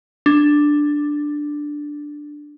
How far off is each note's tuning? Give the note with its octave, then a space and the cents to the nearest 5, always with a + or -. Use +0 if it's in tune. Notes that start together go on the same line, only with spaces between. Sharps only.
D4 +5